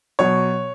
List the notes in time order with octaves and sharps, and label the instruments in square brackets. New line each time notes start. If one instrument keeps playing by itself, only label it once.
[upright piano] B2 F#3 C#5